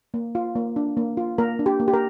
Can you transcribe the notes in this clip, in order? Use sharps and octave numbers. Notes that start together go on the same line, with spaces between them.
A#3
F4
A#3
D4
A#3
F4
A#3 A#4
D4
G4
A#3
G4
A#4